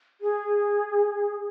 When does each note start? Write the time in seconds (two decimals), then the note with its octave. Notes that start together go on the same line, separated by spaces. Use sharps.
0.21 G#4